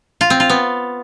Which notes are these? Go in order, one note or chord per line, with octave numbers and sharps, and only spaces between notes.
F4
C4
F4
B3